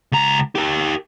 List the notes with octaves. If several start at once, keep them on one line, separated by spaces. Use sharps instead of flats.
C#2 A#5
G4 A#4